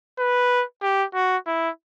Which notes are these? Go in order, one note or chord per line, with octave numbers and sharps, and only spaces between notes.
B4
G4
F#4
E4